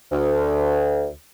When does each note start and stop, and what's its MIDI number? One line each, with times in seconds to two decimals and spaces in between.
0.12 1.09 38